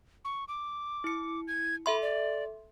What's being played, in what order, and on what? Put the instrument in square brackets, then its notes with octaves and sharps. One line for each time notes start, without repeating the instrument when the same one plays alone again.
[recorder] C#6
D6
[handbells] E4 C#7
[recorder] G#6
[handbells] A4 E5 C6 [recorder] B5
[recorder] D5